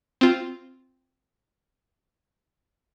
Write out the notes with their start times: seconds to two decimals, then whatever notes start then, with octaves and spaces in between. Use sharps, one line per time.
0.21 C4 F4